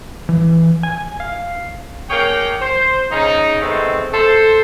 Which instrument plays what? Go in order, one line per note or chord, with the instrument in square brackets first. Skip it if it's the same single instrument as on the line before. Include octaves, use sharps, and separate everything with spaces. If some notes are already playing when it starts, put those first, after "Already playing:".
[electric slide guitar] E3
G#5
F5
[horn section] A#3 C#4 G#4 C#5 G5
C5
C#3 D#4
C3 D#3 G#3 A3 B3 C4
A4 C5